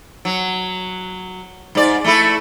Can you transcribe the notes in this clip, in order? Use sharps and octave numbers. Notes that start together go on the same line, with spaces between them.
F#3
G#2 D5
A3 E4 A4